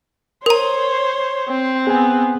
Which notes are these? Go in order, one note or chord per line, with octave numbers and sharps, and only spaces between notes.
A#4 C5 C#5 A#5
C4
B3 G#4 G#5